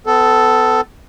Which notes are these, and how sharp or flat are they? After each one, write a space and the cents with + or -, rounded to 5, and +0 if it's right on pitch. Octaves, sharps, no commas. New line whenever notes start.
B3 +35 A4 +0